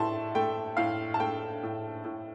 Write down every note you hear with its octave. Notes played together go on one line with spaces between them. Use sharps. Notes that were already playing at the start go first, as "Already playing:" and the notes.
Already playing: A2 A3 A5 C6
A3 G5
A2 F5
A5
A3 G5
A2
A2